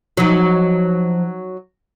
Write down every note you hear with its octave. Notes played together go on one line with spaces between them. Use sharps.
F3 F#3 D#4